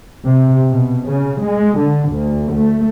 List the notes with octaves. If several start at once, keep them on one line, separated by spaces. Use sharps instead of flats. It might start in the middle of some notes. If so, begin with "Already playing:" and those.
C3
B2
C#3
G#3
D3
D2
A3